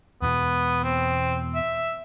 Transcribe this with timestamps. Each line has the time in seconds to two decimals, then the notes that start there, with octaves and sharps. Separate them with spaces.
0.22 E2 B2 B3
0.84 C4
1.55 E5